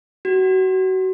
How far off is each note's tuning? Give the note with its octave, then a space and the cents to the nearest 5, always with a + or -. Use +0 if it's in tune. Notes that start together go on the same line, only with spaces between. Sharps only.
F#4 +30